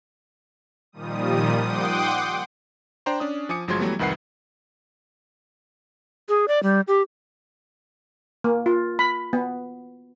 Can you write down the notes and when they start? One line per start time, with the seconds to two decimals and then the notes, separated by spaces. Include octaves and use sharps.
0.92 A#2 D#3 F3 G3 D#6
1.57 F#5 G5 C6 D6 D#6
3.06 D4 C5 G5 A#5 C6
3.20 C#4 D4 D#6
3.49 F3 G#5 D6 D#6 C#7
3.68 G1 F3 F#3 G#3 C6 G#6
3.80 E3 F#3 G3 A3 B3
3.99 C2 F2 D#3 B4 F#5 C7
6.29 G#4
6.48 D5
6.63 G3
6.88 G4
8.44 A#3
8.66 F4
8.99 B5
9.33 B3